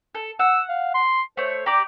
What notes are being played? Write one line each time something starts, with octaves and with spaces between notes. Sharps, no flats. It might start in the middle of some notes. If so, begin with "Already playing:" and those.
A4
F#5 E6
F5
C6
A3 C5 C#5
G4 D5 A#5 D6